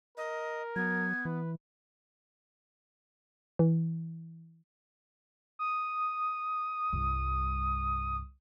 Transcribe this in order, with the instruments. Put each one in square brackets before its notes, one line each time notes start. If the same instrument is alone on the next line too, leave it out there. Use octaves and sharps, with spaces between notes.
[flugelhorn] A#4 [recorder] D#5
[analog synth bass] F#3 [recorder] B3 [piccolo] G#6
[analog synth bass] E3 [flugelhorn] B4
[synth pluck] E3
[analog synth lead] D#6
[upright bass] C2 G2